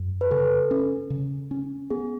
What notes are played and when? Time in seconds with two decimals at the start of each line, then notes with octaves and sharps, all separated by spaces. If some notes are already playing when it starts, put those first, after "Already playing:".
Already playing: F#2
0.21 B4
0.31 C#3 A4
0.71 C#4
1.10 C#3
1.51 C#4
1.90 B3 G#4